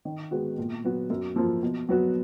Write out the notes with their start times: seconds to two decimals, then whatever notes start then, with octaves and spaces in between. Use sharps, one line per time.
0.05 D#3
0.31 G#3 B3 F#4
0.58 A#2
0.84 F#3 B3 F#4
1.10 F#2
1.36 F3 A#3 F4
1.62 B2
1.89 F#3 B3 F#4